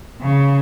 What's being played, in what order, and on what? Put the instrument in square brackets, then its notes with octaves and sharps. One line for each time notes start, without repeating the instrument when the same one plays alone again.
[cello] C#3